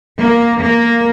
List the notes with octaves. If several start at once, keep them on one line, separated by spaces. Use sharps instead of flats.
A#3
A#3